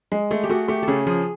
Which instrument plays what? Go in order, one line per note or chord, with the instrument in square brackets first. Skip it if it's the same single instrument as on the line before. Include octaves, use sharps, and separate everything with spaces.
[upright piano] G#3
[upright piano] A3 [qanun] G#4
[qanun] G4
[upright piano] A3 [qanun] F#4
[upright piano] A3 [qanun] G4
[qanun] A4
[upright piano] C#3 [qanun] G#4
[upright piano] F3 [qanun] G#4